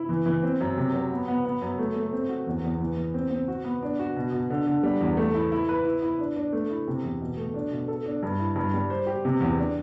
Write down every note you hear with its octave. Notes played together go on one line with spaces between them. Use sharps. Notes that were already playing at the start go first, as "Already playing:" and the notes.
Already playing: E4
E3
E3
C4
F#2
C3
F#3
B3
B3
B3
F#2
A3
A3
C4
F#4
E2
E2
E3
E3
C4
C4
F#4
B3
D4
F#4
B2
B2
D3
D3
G3
E2
A3
E4
E4
B4
E4
E4
D4
D4
A3
E4
C3
E2
B2
A3
D4
B2
A4
D4
G2
E4
G2
G3
C5
G4
C3
E2
D4